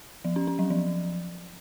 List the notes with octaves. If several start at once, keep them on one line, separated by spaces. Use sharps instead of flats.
F3
C#4
C#4
F#3
F3